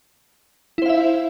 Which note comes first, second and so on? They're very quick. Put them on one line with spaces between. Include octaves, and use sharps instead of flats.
E4 C5 F5 E5